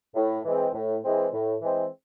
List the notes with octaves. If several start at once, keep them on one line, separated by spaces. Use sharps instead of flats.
A2
E3 G#3 C4
A2
E3 G#3 C4
A2
E3 G#3 C4